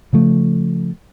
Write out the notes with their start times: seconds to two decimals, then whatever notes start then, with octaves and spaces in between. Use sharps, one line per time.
0.13 C#3 F3 A3